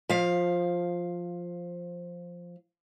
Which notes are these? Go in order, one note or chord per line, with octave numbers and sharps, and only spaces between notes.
F3 F5